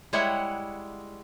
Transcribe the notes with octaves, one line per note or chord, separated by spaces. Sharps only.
G3 G#3 E4 C#5 F#5